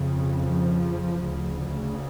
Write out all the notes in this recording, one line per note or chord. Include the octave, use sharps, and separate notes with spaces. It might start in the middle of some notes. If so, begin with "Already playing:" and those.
Already playing: F2 C#3
F3
D2 C#3